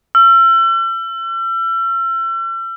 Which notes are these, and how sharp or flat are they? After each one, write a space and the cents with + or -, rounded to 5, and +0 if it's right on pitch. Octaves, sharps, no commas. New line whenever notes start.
E6 +40